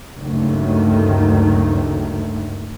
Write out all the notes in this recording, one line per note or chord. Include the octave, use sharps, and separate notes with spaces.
F#1 D2 G2 D#3 A3